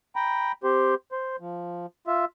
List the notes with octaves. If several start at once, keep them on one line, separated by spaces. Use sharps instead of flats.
G5 A#5 B5
C4 G4 C5
C5
F3
F4 E5